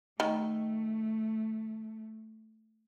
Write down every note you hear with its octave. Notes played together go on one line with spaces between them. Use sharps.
D#3 A3